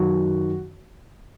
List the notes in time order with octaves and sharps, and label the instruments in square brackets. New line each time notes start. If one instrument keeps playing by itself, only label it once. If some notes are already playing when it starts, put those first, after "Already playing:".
Already playing: [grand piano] F#2 D#3 F#3 F#4